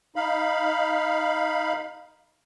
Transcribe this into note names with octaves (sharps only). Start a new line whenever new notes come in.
D#4 F5 B5